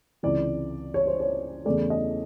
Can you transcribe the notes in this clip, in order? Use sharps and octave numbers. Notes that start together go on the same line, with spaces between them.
C#2 C3 E3 D5
C#5
C5
C#5
E2 C#3 E3 A3 D5
D#5